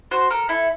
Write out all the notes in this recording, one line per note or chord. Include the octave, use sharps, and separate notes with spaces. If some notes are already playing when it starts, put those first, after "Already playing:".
F#4 C5
A4 A#4
E4 A4